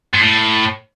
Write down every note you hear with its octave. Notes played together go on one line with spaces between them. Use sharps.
G#2
A2